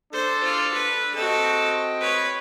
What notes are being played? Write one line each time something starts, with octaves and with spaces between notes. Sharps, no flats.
D4 A4 C5
F4
B4
C4 F#4 A4 D#5 G5
B4 C#5